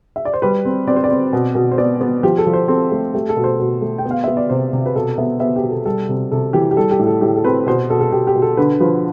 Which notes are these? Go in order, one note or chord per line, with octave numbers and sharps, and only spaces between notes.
E5
D5
C5
G3 B4
C4
C4 D5
C5
D5
C4
B2
B2
C5
B3 D5
B3
F3 G4
A4
F3
C5
C4 A4
A3
A3 G4
A4
B2
C5
B2
A3
G5
B3
F5
B3 E5
D5
C3 C5
C3
B4
B2 A4
B3 E5
B3 E5
G4
B2
A4
G3 A4
C3
C3 A4
E3 G4
G4
G3 A4
G4
A2
A4
A2 G4
A4
C4 B4
B2 C5
B2 A4
A4
B2 G4
G4
B2
A4
D3 B4
F3 B4